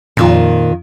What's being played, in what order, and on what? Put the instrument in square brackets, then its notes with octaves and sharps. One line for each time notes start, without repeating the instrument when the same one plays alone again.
[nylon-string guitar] F2 D#3 F4 [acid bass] A#2